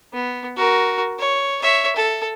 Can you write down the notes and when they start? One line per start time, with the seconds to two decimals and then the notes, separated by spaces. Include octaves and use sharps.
0.13 B3
0.56 F#4 A#4
1.19 C#5
1.62 C#5 E5
1.96 A4